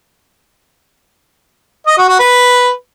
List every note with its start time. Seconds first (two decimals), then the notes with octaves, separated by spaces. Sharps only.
1.87 D#5
1.98 F#4
2.08 F#4
2.19 B4